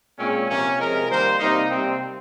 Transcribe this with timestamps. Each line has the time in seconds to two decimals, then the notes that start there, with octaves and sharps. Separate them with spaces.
0.19 A#2 G#3 C4 C#4
0.48 C3 F3 A#3 C#4
0.78 C3 F3 G#3 A#4
1.10 D#3 G3 A#3 C5
1.40 C3 G3 A#3 D#4
1.70 C3 G3 A#3 C4